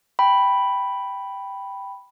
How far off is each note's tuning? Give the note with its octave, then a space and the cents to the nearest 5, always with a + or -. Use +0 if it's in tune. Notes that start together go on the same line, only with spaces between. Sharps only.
G5 +0 B5 +0